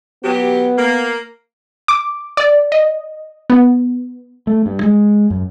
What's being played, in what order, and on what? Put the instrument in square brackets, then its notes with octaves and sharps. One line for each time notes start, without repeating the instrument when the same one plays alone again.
[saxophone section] F#3 G4 [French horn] B3
[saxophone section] A#3
[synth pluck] D6
D5
D#5
B3
[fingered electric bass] A3
G2
G#3
F#2